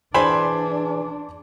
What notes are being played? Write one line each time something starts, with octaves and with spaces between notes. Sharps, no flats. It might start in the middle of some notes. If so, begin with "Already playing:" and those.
E3 D4 G#4 C5 D5 G#5 B5